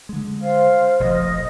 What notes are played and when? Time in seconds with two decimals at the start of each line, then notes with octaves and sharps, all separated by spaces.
0.09 D3 G#3
0.41 C5 F5 F6
1.00 F1 A#1 F3 D#5